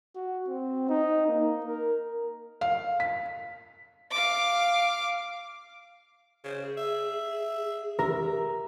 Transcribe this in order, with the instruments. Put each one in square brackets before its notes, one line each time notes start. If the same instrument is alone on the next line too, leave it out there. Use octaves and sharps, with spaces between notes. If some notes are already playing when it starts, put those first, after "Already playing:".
[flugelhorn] F#4
C4
D#4
A#3
A#4
[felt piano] F5
B6
[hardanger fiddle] F5 D6
[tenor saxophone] C#3 [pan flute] C5
[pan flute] G#4
[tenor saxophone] E5
[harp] A#4 [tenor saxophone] E5